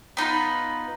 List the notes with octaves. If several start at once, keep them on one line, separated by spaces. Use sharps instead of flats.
B3 D#4 F4 B4